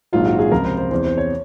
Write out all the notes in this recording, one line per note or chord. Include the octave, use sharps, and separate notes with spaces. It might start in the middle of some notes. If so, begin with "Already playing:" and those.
A#1 G#2 D#3 F#3 F4
F#4
G#4
C#2 C3 F3 A#4
C5
C5
E2 C3 E3 C5
C5
C#5